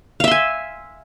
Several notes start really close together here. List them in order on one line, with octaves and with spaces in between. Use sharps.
F5 E5 C6 G#5